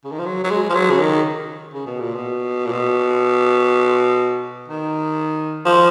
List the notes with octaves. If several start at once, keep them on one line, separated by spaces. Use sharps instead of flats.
C#3
D#3
F3
F#3
F#3
G#3
F3
F#3
C#3
D#3
C#3
B2
A#2
B2
A#2
B2
D#3
F3